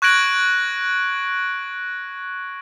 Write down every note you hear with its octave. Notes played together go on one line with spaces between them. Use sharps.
C#6 F#6 G#6 A#6 D7 F#7